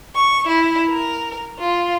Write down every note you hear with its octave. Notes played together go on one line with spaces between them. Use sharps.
C#6
E4
A#4
F4